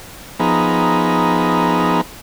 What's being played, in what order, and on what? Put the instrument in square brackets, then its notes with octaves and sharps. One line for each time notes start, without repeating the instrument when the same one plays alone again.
[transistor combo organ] F3 B3 D#4 G#4 A#5 B5